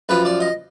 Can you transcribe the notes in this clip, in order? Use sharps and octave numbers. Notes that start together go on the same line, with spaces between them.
F#2 F3 B4
D5
D#5